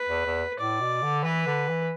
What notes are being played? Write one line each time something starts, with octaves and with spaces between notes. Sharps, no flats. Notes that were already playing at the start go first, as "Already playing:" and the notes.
Already playing: B4
E2
E2
A2 D5
B2
D3
E3 B4
D3
E3